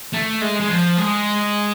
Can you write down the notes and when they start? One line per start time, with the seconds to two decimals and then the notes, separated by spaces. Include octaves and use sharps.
0.13 A3
0.41 G#3
0.60 G#3
0.69 F3
0.97 G#3